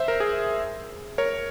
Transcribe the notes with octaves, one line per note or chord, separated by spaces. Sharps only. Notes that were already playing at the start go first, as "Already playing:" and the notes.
Already playing: C5 E5
A#4
G#4
A#4 C#5